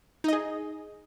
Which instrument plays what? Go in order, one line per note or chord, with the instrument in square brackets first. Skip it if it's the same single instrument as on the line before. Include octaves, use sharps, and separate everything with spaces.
[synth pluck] D#4
D#5
G#4